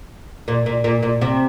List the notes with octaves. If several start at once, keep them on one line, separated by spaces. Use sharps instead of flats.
A#2
A#2
A#2
A#2
C3